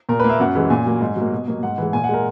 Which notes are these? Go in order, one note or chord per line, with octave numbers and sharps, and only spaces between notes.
A#2 A#4
A#3 B4
E5
F#2 F#5
E3 G#3
A#2 G#5
F#3 A#3
G#2
F#3 A#3
B2
F#3 A#3
G#2 F#5
E3 G#3
A#2 G#5
F#5
G#3 A#4